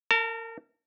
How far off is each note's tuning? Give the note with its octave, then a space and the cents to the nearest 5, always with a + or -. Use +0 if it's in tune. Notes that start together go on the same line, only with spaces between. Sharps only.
A#4 -30 A5 +15